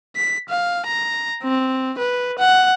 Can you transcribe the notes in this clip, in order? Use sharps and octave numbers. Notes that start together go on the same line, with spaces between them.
B6
F5
A#5
C4
B4
F#5